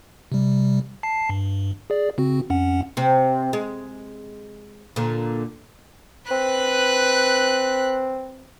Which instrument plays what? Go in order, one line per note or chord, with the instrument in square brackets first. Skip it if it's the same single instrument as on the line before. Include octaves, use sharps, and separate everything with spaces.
[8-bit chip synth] C3 G3
A5 C7
G2
G#4 D5
C#3 C4 F#4
F2 C#4 F#5
[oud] C3 C4
G#3
A#2 D3
[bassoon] C4 [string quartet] B4 F#6